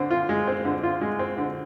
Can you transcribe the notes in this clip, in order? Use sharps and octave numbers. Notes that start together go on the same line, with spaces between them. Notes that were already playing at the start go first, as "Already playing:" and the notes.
Already playing: D3 C4
F4
G#3
C4
D3
F4
G#3
C4
D3